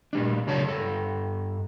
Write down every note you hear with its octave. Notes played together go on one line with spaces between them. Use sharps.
A#2 G3 D4
C#3 F#3 D4 C#5 A5
G2 A4